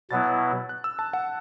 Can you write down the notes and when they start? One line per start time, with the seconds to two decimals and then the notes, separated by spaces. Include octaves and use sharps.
0.10 B2 F#3 B3 E4 A6
0.69 F#6
0.84 E6
0.99 A5
1.13 F#5